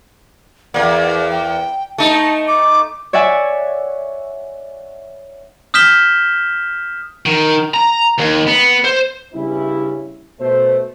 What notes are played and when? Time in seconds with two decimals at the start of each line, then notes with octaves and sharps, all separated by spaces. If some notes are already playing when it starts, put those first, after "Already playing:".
0.74 E2 A#3 D5
1.31 G5
1.98 A3 D#4 A5
2.48 D6
3.13 C#5 D5 E5 F#5 G#5
5.74 D#6 F6 G6 B6 E7 G7
7.26 D#3
7.74 A#5
8.18 D#2
8.47 B3
8.84 C5
9.34 G2 C#3 G3 B3 C#4 E4
10.39 B2 A3 C5